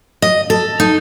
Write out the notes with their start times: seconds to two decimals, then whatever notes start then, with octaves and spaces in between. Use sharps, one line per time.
0.22 D#5
0.50 A4
0.80 D#4